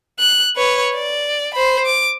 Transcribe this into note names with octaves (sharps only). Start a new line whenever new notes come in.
F#6
B4 C#5
D5
C5 B5
D6